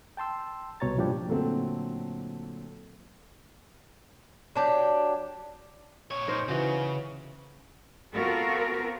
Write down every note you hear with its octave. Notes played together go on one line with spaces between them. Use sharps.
G5 A5 C6 E6
C2 B2 C#5 A#5 A6
G2 A#2 F3 G3 D4 G4
A#2 D3 F#3 A3 C4
F#3 D4 G4
A#2 C#5
D#4 A#4 C5
C#3 E3 F#4 D#5
B3 C4 F4 F#4 A4 A#4